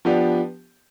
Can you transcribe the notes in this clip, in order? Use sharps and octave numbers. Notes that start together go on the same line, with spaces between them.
F3 B3 D4 G4